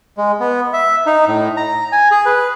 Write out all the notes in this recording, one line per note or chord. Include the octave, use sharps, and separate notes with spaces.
G#3
B3
E5
D#4
A2
A#5
G#5
G#4
B4